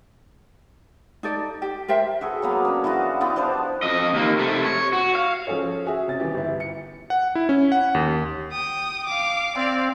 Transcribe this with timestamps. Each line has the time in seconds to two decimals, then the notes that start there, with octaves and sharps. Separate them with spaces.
1.23 D#4 A4 D5
1.62 G4
1.88 A#4 C5 E5 G5
2.21 F#4 G#4 A4 B4
2.42 F#3 A#3 B3
2.65 C#4 D4
2.84 E3 B3 F4 F#4
3.21 B3 E4 F4 G4
3.36 F3 D4 B4 C5
3.83 F2 D#5
4.14 D#2 A#3
4.39 C3 A3
4.64 C#5
4.93 F#4
5.15 F5
5.47 F3 C#4 G#4 A4 C#5
5.86 F#4 G#4 E5
6.08 C3 C#4 A6
6.20 D#1 E3 G4
6.34 G1 E4
6.60 C#7
7.10 F#5
7.35 E4
7.49 C#4
7.72 F#5
7.95 D#2
8.52 G5 D#6
9.07 F5 D6
9.56 C4 D5 F5